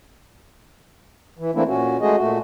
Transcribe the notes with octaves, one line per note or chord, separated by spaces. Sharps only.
E3
E3 A3 A#3 C4 D4 E4
A#2 C#4 F#4
G#3 A3 F#4 G#4 D#5
A#2 A3 F#4